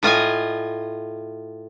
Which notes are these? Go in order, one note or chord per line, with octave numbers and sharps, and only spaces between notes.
A2 F4 D#5 G#5